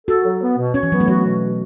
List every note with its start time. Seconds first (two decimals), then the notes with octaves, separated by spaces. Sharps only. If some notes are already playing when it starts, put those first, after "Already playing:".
0.07 F#4 A4
0.25 F#3
0.42 B3
0.58 B2
0.74 C#4 C#5
0.83 E3
0.92 F#3 B3
1.00 A3
1.08 F#3 F#4
1.26 B2
1.42 F#4